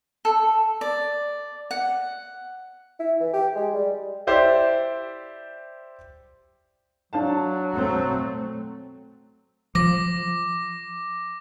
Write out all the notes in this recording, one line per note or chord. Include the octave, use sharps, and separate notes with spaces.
A4
D5
F#5
E4
E3
G4
G#3
G3
E4 G4 C5 D5 E5
F#3 D4 F5 A5
B2 A3 C4
F3 D6 A#6